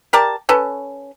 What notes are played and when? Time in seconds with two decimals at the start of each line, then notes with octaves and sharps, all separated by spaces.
0.13 G4 A#4 D5 A5
0.49 C#4 A4 B4